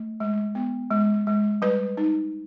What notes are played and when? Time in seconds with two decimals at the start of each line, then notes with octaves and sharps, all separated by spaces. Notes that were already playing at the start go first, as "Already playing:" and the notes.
Already playing: A3
0.20 G#3
0.55 B3
0.91 G#3
1.27 G#3
1.62 G3 B4
1.97 D#4